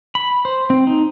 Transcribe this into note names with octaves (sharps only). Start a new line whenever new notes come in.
B5
C5
C4
D#4